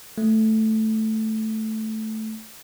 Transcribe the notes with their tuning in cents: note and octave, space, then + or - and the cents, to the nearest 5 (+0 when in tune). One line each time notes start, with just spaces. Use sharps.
A3 -5